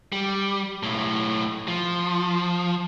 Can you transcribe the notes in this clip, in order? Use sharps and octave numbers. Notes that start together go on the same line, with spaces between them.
G3
B1 A2
F3